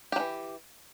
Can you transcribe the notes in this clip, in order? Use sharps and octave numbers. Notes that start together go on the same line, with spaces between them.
E3 F#3 G4